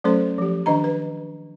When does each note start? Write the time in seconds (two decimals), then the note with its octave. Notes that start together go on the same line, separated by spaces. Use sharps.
0.04 F#3 A3 C#4 A4 C5 C6
0.38 F3 G4
0.66 D#3 D4 D#5 A#5
0.84 B4